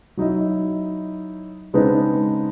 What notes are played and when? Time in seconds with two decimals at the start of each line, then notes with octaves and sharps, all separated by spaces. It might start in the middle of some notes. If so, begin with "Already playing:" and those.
0.17 F#3 D#4 E4 D#5
1.74 C#3 G#3 B3 C4 D4 D#4